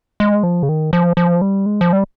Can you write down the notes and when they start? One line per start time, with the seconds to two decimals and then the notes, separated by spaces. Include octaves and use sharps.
0.20 G#3
0.43 F3
0.63 C#3
0.69 D#3
0.93 F3
1.17 F3
1.41 G3
1.66 G#3
1.81 F3
1.93 G3